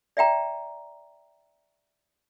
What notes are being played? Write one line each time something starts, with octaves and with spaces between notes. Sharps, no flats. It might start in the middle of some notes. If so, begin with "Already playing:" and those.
D5 E5 G5 A#5